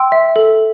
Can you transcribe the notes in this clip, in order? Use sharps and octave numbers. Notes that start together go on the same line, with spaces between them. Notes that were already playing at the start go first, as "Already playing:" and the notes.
Already playing: G5 C6 E6
E5
A4